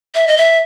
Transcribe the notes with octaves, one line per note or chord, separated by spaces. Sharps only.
E5
D#5
E5